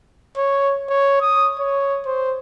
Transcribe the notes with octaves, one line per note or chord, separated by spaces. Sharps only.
C#5
C#5
D#6
C#5
C5